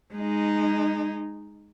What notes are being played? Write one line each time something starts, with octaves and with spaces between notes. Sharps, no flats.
G#3 D#4